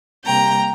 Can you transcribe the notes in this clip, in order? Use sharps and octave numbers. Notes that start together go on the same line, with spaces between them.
C3 G3 A#3 G5 A#5